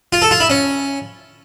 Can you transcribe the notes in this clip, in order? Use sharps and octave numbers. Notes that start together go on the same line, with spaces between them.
F4
A4
F4
E4
C#4